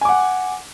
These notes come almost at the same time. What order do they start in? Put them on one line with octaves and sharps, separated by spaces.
G#5 D6 F#5